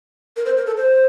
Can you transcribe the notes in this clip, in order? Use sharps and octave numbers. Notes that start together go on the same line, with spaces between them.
A#4
C5
A#4
A4
C5